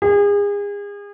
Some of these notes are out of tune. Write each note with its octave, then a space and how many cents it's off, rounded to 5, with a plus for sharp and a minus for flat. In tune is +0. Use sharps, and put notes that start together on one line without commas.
G#4 -35